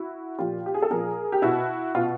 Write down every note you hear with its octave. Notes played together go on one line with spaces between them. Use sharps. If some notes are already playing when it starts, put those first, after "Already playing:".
Already playing: E4 F#4
A#2 F3 F4 G4
G4
G#4
A4
A#2 F3 G#4 A#4
G4
B2 E4 F#4
B2 F4